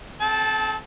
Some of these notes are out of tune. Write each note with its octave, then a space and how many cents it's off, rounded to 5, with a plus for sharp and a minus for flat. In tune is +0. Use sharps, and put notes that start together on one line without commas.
C4 +0 A4 -40 A5 -10